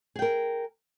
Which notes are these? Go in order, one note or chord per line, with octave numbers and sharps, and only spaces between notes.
G#4 A#4 G5